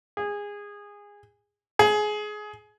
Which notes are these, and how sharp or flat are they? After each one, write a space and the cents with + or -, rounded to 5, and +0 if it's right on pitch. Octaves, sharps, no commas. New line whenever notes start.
G#4 -20
G#4 +20